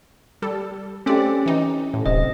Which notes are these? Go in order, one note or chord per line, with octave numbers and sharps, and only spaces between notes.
G3 A4
A3 C4 C#4 G4 D5
E3 D#4
A2
D1 C3 D#5